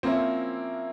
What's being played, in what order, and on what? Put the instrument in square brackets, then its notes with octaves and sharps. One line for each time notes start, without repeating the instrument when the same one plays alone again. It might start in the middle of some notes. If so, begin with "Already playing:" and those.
[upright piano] F3 A#3 C#4 E4 [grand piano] C4